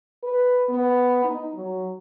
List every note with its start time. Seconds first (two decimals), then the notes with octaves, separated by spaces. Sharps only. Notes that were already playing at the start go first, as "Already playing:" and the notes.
0.23 B4
0.69 B3
1.24 D#4
1.55 F#3